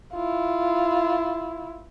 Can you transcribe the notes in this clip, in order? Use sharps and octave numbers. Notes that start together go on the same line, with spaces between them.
E4 F4